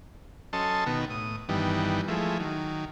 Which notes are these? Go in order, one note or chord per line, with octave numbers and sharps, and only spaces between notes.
F#3 C#4 A4 D#5 A5 C6
B2 D#3 B3 F#4
A2 D#6
G2 D#3 E3 G3 B3
F3 G#3 A3 E4
D#3 F#3